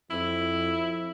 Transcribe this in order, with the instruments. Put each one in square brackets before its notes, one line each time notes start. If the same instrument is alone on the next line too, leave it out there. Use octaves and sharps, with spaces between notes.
[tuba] F2 [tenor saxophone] E4